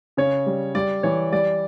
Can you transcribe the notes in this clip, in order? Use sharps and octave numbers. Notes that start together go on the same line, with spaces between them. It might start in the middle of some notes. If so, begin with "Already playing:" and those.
C#3 C#5
G3
G3 D5
E3 C#5
G3 D5